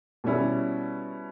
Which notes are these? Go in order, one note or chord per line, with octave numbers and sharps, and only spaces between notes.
B2 G3 C#4 E4